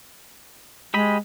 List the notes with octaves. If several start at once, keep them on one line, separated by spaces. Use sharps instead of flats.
G#3 G4 D#5 B5